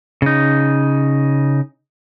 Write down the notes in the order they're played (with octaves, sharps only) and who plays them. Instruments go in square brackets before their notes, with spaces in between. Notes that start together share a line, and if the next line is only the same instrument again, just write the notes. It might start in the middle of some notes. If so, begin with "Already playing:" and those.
[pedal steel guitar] C#3 D#4